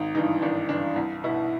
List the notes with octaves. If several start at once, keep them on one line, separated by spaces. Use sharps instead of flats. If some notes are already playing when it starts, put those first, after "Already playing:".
Already playing: G#1 D#4
G2 E3 D#4
G#1 D4
G2 E3 D4
C2
B2 E4